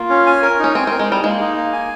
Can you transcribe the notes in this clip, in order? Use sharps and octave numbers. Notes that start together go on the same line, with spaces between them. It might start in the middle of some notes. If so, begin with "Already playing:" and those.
Already playing: A#3 F4
C#4
G#5
A#4
C#4 D#4
C4 G#5
C4
A#4
G#3
G3 D#4
G#3 A#3
D#4
A#3
G#5